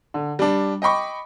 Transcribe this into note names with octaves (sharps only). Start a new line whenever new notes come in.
D3
G3 D4
D#5 G5 B5 C#6 D6